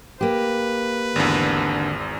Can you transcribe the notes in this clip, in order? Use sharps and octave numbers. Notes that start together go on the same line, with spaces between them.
A#3 G4 B4
G#1 E2 D3